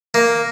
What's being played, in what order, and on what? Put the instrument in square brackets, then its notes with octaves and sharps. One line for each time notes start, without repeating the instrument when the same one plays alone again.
[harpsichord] A#3